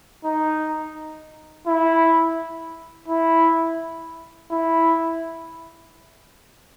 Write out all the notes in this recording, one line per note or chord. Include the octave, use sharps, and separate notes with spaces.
D#4
E4
E4
E4